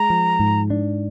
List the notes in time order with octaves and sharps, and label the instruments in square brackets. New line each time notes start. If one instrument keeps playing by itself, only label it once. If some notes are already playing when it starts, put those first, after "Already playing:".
Already playing: [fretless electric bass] G#3 [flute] A#5
[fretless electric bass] F3
G#2
D4